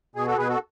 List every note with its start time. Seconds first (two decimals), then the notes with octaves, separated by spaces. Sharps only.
0.15 B2 G#4
0.27 F#4 A4
0.37 B2 G#4 B4
0.48 F#4 A4